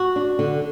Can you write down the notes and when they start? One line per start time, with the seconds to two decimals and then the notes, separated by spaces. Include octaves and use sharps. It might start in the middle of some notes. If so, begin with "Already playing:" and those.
Already playing: F#4
0.16 D4
0.39 D3